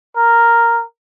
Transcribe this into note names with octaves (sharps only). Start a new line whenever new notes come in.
A#4